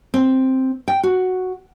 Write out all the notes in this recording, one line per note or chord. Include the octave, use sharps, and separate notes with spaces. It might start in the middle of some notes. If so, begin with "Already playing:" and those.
C4
G5
F#4